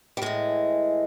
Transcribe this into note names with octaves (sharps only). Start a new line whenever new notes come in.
G3
A2 E3 G#3